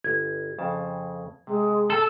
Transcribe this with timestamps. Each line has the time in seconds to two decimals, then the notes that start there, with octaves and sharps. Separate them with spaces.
0.04 G1 G#6
0.59 F2 C#3 A5
1.47 C3 G#3
1.90 A4